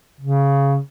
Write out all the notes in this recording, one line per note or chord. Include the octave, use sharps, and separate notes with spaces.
C#3